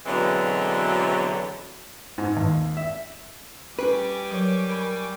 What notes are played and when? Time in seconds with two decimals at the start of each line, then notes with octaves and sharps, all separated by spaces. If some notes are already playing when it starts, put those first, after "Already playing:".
0.06 B2 D3 E3 F#3 G#3 C4
2.18 G#2
2.37 D#2
2.77 E5
3.79 G3 C#4 B4 G5 G#5 C#6 D6
4.31 F#3 A#4 C#5
4.70 A#4 B5